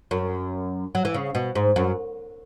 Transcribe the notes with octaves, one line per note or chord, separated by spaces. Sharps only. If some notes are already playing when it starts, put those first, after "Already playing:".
F#2
F#3
E3
C#3
B2
G#2
F#2